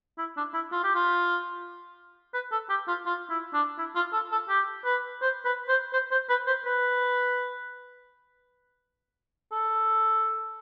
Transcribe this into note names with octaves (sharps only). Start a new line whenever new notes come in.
E4
D4
E4
F4
G4
F4
B4
A4
G4
F4
F4
E4
D4
E4
F4
A4
A4
G4
B4
C5
B4
C5
C5
C5
B4
C5
B4
A4